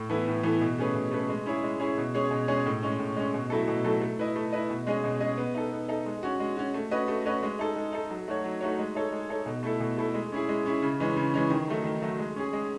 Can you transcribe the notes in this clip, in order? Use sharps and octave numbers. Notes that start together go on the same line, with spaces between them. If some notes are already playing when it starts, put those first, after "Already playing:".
Already playing: A2
E3 B3 E4 A4
A2
E3 B3 E4 A4
B2
A3 C#4 G#4 B4
B2
A3 C#4 G#4 B4
G#3
C#4 E4 G#4 C#5
G#3
C#4 E4 G#4 C#5
B2
G#3 C#4 G#4 C#5
B2
G#3 C#4 G#4 C#5
A2
G#3 C#4
A2
G#3 C#4
B2
F#3 A3 E4 A4
B2
F#3 A3 E4 A4
A3
E4 B4 D#5
A3
E4 B4 D#5
B2
G#3 C#4 G#4 D#5
B2
G#3 C#4 G#4 D#5
B3
D#4 A4
B3
D#4 A4
G#3
C#4 F#4
G#3
C#4 F#4
A3
C#4 F#4 B4 D#5
A3
C#4 F#4 B4 D#5
G#3
D#4 A4
G#3
D#4 A4
F#3
A3 D#4 F#4 C#5
F#3
A3 D#4 F#4 C#5
G#3
D#4 A4 C#5
G#3
D#4 A4 C#5
B2
A3 E4 A4
B2
A3 E4 A4
G#3
C#4 E4 G#4
G#3
C#4 E4 G#4
C#3
E3 G#3 C#4
C#3
E3 G#3 C#4
D#3
F#3 A3 D#4
D#3
F#3 A3 D#4
G#3
C#4 G#4
G#3